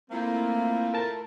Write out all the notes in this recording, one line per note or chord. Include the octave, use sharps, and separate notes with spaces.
A3 A#3 C4 E4 F4
A#4 A5